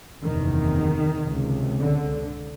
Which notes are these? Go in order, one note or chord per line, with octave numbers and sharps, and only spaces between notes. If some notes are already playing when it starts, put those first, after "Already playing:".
F#1 E2 C3 D#3
C#2 C3
D3